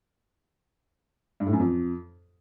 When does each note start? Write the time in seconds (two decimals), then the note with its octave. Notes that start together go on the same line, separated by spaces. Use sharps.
1.40 G2
1.47 A2
1.53 F#2
1.59 F2